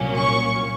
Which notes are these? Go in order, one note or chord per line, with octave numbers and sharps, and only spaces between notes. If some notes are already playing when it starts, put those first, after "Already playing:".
Already playing: C2 A#2 F#3 A#3 C#4
C#6